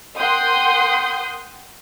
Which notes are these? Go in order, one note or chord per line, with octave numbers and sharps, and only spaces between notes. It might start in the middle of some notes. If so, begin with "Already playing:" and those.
A#4 F#5 G5 C6 D#6 G6